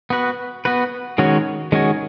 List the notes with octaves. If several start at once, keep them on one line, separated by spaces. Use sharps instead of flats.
B3 F#4 B4
B3 F#4 B4
D#3 G#3 C#4 F#4 C#5
D#3 G#3 C#4 F#4 C#5